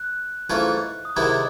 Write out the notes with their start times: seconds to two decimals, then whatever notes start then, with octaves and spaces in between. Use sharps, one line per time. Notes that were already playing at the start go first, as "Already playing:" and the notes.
Already playing: F#6
0.50 G#2 E3 A3 C#4 F4
1.05 D#6
1.16 C3 D#3 G#3 B3 E4 D6